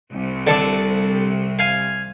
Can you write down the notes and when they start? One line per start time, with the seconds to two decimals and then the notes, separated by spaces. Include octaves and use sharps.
0.13 C2 C3
0.47 D3 A4 D5
1.59 F5 G#5